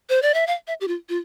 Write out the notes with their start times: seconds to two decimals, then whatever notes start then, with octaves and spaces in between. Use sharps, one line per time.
0.10 C5
0.22 D5
0.34 E5
0.47 F5
0.67 E5
0.81 G4
0.88 F4
1.09 F4